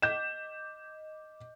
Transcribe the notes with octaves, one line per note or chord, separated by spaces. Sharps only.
D#5 D6 G6 E7